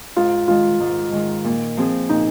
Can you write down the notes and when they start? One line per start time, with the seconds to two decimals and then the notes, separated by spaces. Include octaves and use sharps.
0.16 G#2 F4
0.48 D#3 G#3 F4
0.80 G#2
1.12 D#3 G#3
1.44 A#2
1.77 F3 C4 F4 G#4
2.09 A#2 D#4